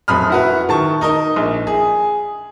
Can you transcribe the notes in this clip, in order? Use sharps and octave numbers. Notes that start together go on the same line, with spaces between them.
F1 F#2 B5 D#6 F6
E4 F#4 B4
D#3 A5 C#6
D#4 A#4 D#5
A#1
G#4